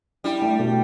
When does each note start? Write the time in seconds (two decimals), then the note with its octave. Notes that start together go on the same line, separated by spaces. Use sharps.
0.24 G3 E4
0.42 A3
0.59 B2